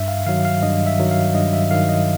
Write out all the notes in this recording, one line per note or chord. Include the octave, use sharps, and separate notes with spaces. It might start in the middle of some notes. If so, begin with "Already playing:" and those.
Already playing: G2 E5
F5
D#3 F#3 F5
F5
G2 D#5
E5
D#3 F#3
F5
G2 D#5
E5
D#3 F#3 F5
D#5